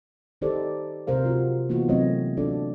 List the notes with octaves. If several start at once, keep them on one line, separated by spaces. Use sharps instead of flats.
D#3 D#4 G4 A4 C5 D5
C3 A#4 C5 F5
F4 F#4
E3 A#3 B3 D#4 F4 F#4
C3 F#3 A3 C4 C#5 D#5
D4 F#4 A4 D5